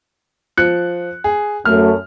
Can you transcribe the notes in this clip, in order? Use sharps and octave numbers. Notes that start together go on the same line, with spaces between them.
F3 F#6 C#7
G#4
F#2 A3 F6